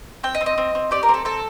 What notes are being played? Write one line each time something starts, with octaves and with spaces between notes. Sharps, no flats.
C4 G5
D#5
C4
D#5
C4
C4
G4 D5
A#4
C4
A4
C4 A4